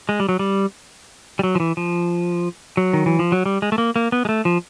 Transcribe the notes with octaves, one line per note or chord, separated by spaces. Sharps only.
G#3
G3
F#3
G3
G3
F#3
F3
E3
F3
F#3
D#3
E3
F3
F#3
G3
G#3
A3
A#3
A#3
B3
G#3
A3
F3